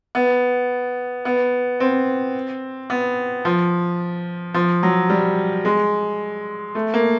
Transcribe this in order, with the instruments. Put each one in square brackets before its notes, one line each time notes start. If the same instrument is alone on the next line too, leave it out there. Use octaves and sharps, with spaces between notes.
[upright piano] B3
B3
C4
B3
F3
F3
F#3
G3
G#3
A3
A#3